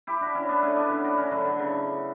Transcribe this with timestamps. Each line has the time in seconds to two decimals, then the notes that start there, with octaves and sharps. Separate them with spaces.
0.07 E4 G4
0.21 D4 F#4
0.34 C#4 E4
0.49 B3 D4
0.62 A3 C#4
0.76 B3 D4
0.90 C#4 E4
1.04 D4 F#4
1.17 C#4 E4
1.31 D3 F#3
1.45 D3
1.59 C#3